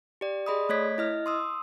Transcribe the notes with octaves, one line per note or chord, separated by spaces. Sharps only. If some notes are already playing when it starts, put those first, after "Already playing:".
G4 D5
G#4 D5 D#5 B5 C6 D#6
A3 A4 C#5 D#5 G#6 B6
E4 D#5 F6
C6 D#6 E6